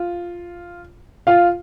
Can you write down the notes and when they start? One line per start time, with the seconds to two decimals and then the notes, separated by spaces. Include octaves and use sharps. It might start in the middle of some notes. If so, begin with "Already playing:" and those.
Already playing: F4
1.27 F4 F5